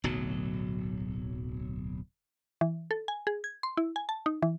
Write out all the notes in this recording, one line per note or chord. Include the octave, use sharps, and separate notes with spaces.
D1 B1 F#3
E3
A4
G#5
G#4
G#6
C6
E4
G#5
A5
D#4
E3